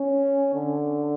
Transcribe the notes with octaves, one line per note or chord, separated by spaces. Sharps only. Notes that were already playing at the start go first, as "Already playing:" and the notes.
Already playing: C#4
D3